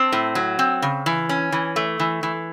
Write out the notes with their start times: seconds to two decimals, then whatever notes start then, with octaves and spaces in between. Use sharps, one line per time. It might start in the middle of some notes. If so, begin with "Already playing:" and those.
Already playing: C4 A5
0.12 A2
0.35 F#3
0.59 C4
0.82 C#3
1.06 E3
1.29 C#4
1.52 E3
1.76 A3
2.00 E3
2.23 E3